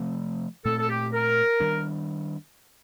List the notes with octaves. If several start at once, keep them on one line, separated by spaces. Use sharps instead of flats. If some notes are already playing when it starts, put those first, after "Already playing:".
Already playing: C3 F3 A3 C4
A#2 A3 C4 A4
A4
G4
A#4
D#3 G3 D4